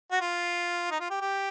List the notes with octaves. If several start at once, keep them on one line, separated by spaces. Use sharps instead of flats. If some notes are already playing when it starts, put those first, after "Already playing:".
F#4
F4
D#4
F4
G4
G4